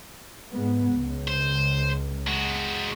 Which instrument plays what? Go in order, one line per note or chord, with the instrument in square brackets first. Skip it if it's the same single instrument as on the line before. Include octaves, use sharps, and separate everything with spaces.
[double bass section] G#2 B3
C#2
[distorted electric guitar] C5
G#3 F#4